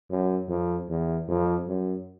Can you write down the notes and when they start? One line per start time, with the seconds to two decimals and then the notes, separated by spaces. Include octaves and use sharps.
0.10 F#2
0.49 F2
0.89 E2
1.28 F2
1.68 F#2